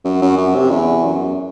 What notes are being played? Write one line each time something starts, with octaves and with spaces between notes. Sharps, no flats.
F#2
F#2
F#2
C3
E2
F#2